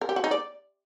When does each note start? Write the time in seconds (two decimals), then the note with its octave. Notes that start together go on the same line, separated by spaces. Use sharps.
0.01 A#4
0.09 G4
0.16 F#4
0.24 D#4
0.31 D5